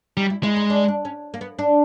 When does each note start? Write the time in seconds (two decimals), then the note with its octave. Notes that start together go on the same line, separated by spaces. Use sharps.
0.17 G3 D#4
0.30 E4
0.43 G#3 E4
0.56 D#4
0.70 D4
0.88 D4
1.05 C#4
1.34 A#3
1.41 B3
1.59 D4